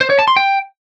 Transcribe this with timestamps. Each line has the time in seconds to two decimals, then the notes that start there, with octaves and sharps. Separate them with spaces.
0.01 C5
0.10 C#5
0.19 A5
0.28 C6
0.37 G5